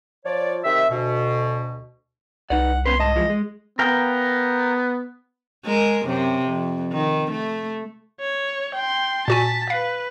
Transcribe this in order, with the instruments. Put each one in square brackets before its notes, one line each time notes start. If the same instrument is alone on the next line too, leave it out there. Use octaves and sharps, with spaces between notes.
[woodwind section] F3 C#5 D5
C3 D#3 G4 E5
D2 B2
[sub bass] C2 [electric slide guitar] D#4 B4 D5 [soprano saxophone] F#5
[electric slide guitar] B3 C#4 B4 [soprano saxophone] C6
[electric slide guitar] G#2 A5 [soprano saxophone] D#5
[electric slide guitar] E3 F3 G#3
G#3
[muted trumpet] B3 [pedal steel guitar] A#4 F5 G5
[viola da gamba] G#3 A#4
F#2 C3
F2
D#3
A3
[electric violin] C#5
G5 C6
[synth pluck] A#2 F#4 G#5 [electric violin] A5 B6
[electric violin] B4 [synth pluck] F5